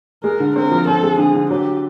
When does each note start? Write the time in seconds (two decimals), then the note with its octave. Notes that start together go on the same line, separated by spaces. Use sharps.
0.24 G#3 A#4
0.40 D3
0.56 C4 A#4
0.72 F3
0.87 C4 A4
1.03 G#3
1.18 D3 G#4
1.35 D3
1.50 F#3 G4